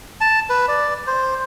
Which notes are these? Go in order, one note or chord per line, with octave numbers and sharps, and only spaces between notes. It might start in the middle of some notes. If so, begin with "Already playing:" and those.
A5
B4
D5
C5